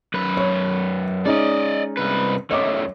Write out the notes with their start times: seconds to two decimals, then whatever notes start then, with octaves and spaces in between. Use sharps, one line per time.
0.14 F#2 B4
0.37 C#5
1.26 G#3 C#4 D#4 D5 D#5
1.97 C2 B4
2.51 F#2 A3 C#5 D#5 D6